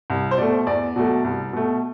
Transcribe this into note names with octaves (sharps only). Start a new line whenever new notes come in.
C2
C5
B2 A3 D5
E2 D5
B2 F#3 A3
C2
B2 A3